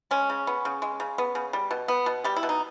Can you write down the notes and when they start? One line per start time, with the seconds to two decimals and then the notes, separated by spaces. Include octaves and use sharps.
0.11 G#3 C#4
0.30 C#3
0.47 B3
0.65 C#3
0.82 G#3
1.00 C#3
1.18 B3
1.35 C#3
1.53 G3
1.71 B2
1.88 B3
2.06 B2
2.24 G3 G4
2.36 E4
2.43 B2
2.49 D#4